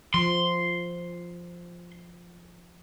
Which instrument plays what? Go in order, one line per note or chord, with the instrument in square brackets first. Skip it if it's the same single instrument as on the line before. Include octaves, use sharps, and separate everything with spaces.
[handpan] F3 [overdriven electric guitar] C6